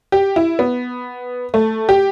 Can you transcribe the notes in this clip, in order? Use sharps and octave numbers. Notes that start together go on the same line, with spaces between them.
G4
E4
B3
A3
G4